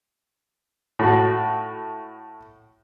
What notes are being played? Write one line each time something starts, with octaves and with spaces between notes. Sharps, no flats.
A2 F#4